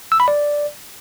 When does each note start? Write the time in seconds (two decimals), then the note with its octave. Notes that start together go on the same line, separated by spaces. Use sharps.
0.12 E6
0.20 B5
0.28 D5